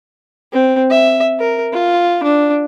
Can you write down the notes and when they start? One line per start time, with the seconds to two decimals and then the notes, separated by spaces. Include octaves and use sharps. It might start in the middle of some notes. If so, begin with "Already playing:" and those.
0.52 C4
0.90 E5
1.39 A#4
1.73 F4
2.23 D4